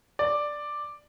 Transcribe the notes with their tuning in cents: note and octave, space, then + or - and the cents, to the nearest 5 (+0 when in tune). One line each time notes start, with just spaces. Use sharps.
D5 +5